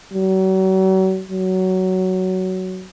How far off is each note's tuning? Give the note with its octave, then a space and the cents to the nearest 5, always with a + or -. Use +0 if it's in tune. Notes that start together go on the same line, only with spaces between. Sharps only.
F#3 +40
F#3 +15